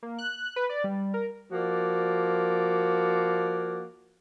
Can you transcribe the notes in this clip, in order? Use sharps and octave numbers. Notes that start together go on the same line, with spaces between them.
A#3
F#6
B4
D5
G3
A#4
F3 A#3 F#4 D5